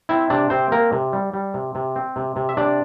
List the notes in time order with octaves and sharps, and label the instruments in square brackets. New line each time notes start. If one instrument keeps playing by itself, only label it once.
[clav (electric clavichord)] C4 E4 E5
C3 D4 D5
C3 C4 C5
A#3 C4 A#4
C3
G3
G3
C3
C3
C4
C3
C3
E5
C3 D4 D5